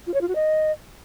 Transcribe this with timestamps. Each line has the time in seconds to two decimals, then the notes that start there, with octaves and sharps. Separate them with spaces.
0.07 F4
0.14 C#5
0.21 F4
0.28 F#4
0.35 D#5